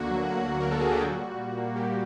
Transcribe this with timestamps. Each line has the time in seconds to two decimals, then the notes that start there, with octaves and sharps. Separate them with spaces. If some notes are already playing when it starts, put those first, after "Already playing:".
Already playing: D2 D3 A#3 F#4
0.10 F#3
0.29 A#3
0.47 D3
0.61 A#4
0.66 D2
0.71 A4
0.81 F#3 G#4
0.92 G4
1.03 A#2 F#4
1.21 G3
1.39 A#2
1.58 A#3
1.76 A#2 G4